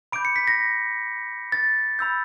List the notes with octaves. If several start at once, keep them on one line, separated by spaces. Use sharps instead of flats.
B5 D6 G6 D7
C#7
B6
A#6
A6
B5 E6 G6